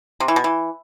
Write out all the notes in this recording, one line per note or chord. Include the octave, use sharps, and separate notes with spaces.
C3
E3
B2
E3